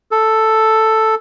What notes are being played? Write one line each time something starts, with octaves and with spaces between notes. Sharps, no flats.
A4